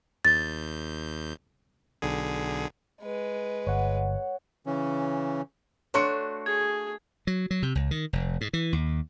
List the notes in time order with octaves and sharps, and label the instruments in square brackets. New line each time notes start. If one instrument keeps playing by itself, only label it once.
[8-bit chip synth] D#2 G6 [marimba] A6
[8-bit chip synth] B1 D3 G#4
[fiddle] G#3 B4
[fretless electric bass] G1 [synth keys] C#5 F#5
[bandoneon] C#3 E3 C#4
[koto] A3 D4 F#4 [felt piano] C#5 C6 C#7
[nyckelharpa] G#4 [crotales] G#6
[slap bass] F#3
F#3
C3
C#2
D#3
F1
G#2
E3
D#2